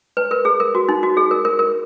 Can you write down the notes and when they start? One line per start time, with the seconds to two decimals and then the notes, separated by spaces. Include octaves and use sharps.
0.17 B4
0.31 A#4
0.45 G#4
0.60 A#4
0.75 F#4
0.89 D#4
1.03 F#4
1.17 G#4
1.31 A#4
1.45 A#4
1.59 A#4